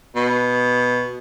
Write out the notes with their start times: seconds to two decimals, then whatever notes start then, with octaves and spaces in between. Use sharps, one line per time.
0.16 B2